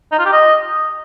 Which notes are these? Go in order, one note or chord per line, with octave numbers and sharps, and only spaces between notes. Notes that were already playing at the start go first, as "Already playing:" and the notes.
D#4
F4
G4
D#5